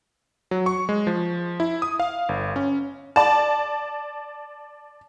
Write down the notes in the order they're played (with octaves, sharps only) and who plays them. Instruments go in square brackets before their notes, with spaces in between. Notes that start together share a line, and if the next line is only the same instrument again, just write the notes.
[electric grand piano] F#3
C#6
G#3
F3
E4
D#6
F5
G1
C#4
[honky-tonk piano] D5 A5